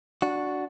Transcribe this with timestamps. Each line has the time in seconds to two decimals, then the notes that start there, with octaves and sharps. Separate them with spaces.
0.22 D4 F#4